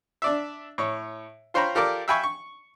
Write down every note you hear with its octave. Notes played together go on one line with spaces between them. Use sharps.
D4 D5 E5
A2 C#5
F4 C5 C#5 G5 A#5 B5
F4 G4 A4 A#4 D5
E5 F5 G5 G#5 B5 C#6
C#6